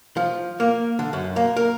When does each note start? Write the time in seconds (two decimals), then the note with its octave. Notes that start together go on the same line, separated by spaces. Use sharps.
0.17 F3
0.60 A#3
0.99 D3
1.13 F#2
1.36 A#3
1.57 A#4